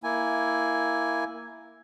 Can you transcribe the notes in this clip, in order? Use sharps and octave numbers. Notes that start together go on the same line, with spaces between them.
A#3 E4 G#5